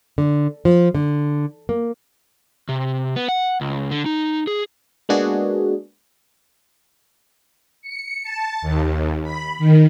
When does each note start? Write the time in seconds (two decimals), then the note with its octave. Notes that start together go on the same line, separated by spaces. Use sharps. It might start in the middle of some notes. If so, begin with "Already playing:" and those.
0.18 D3
0.65 F3
0.95 D3
1.69 A#3
2.69 C3
3.16 B3
3.29 F#5
3.61 C#2
3.91 D3
4.06 D#4
4.47 G#4
5.09 G#3 A#3 B3 D4 F#4 G#4
7.82 C#7
8.23 A5
8.62 D#2
9.23 B5
9.59 D#3